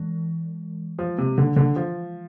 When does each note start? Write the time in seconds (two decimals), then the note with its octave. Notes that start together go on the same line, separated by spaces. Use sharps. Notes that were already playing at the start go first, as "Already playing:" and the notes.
Already playing: E3 G#3
0.99 F3
1.18 C3
1.38 D3
1.56 D3
1.76 F3